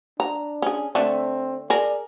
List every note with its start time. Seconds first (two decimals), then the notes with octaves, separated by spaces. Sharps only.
0.20 D4 A#5
0.62 C#4 G#4
0.95 D3 A3 C4
1.70 G#4 A#4 D5